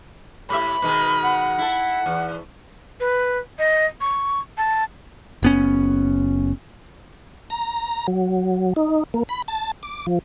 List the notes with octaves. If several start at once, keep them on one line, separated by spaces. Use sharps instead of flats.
A2 G4 E5 B5
B2 D#3 G#3
F#5
E4 A4
E2
B4
D#5
C#6
A5
F#1 B3 C#4
A#5
F#3
D#4
A#3
B5
A5
D6
F3